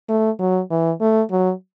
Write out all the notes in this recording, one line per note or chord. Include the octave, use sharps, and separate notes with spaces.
A3
F#3
E3
A3
F#3